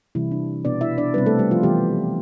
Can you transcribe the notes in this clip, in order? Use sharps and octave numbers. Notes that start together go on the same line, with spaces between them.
C3 E3 G3 E4
D4
B2 B3 D4 D5
E4 E5
D4 D5
C3 G3 B3 C4 B4
A3 A4
G3 G4
F3 F4
E3 G3 B3 G4